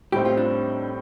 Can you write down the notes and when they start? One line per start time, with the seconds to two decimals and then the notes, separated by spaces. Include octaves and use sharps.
0.12 A2 G3 C4 D#4 G4
0.25 F4
0.37 D4